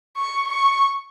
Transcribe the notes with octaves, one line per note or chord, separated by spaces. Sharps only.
C#6
C#6